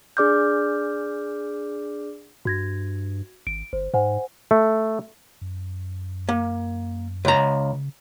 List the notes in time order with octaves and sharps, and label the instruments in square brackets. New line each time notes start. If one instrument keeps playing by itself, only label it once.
[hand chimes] D4 G#4 D5 D6 F6 G6
[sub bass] G2 [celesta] F#4 G#6 A#6
[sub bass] G#1 [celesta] D7
[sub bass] G1 [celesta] C5
[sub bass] G#2 [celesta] C5 F#5 G#5
[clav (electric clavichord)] A3
[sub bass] F#2
[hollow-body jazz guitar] A#3
C#2 A#5
[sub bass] C#3